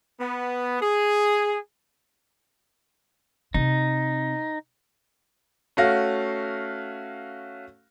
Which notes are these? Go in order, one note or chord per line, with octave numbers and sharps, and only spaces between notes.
B3
G#4
C3 C4 D#4
A3 C#4 F#4 F5 A#6